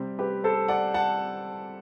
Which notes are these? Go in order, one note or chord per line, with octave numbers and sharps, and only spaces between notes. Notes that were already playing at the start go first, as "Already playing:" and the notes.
Already playing: C3 G3 C4 G4
G4 B4
A4 C5
D5 F#5
F#5 A5